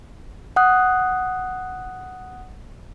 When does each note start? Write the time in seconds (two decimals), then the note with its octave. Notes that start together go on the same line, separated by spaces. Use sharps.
0.56 F#5 D#6 F#6